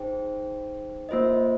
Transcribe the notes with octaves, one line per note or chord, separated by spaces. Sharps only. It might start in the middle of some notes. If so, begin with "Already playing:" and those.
Already playing: D#4 G#4 C5 G5
A#3 F4 C5 D#5